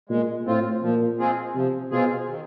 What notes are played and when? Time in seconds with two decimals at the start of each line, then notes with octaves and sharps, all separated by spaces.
0.09 A#2 G#3
0.46 A2 C4 F4
0.82 A#2 F3
1.19 G#3 C4 F4 G#4
1.55 C3 F3
1.91 B2 G#3 C4 F4 G#4
2.28 D#3